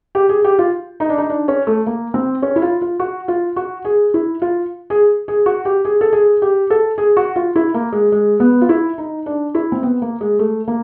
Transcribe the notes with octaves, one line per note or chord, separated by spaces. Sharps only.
G4
G#4
G4
F4
D#4
D4
D#4
D4
C#4
A3
A#3
C4
C#4
E4
F4
F4
F#4
F4
F#4
G#4
E4
F4
G#4
G#4
F#4
G4
G#4
A4
G#4
G4
A4
G#4
F#4
F4
E4
A#3
G#3
G#3
B3
F4
E4
D#4
D4
E4
C4
B3
A#3
G#3
A3
A#3